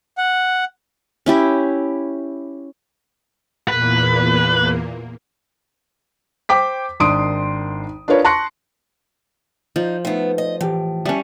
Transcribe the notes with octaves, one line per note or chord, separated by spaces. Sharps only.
F#5
C#4 E4 G4
E2 A#2 A#3 B4
C5 G5 D6 B6
G#1 D#3 D4 C6 D#6 D7
D4 F4 A#4 B4 C#5
A5 C6 C#6 F#6 A#6 C#7
F3 D#4
A3 B3 D#4 E5 F5
D#5
A2 E3 G4
G3 C#4 E5 A5